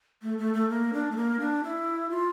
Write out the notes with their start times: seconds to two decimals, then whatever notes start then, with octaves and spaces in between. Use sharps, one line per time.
0.22 A3
0.38 A3
0.54 A3
0.69 A#3
0.93 D4
1.11 A3
1.16 A#3
1.40 D4
1.63 E4
2.10 F4